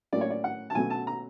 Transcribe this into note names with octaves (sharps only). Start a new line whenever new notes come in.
A2 F#3 A#3 C#4 D5
C#5
D5
F#5
A5
B2 F#3 A3 C#4 G#5
A5
A#5